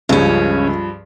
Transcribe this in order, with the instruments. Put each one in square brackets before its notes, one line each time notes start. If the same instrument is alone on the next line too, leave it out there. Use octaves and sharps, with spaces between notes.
[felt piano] C#2 [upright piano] G2 F3 [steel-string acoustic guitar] C#3 C#4